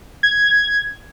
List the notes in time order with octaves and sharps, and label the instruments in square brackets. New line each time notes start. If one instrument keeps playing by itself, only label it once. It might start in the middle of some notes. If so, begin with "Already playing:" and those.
[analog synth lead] G#6